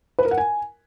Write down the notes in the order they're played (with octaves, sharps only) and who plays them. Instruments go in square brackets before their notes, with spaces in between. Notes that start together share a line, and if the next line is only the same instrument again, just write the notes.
[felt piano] B4
A#4
F#5
G#5